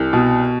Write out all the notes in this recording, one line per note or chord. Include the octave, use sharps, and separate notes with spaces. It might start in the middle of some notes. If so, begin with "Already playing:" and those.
Already playing: C2
B2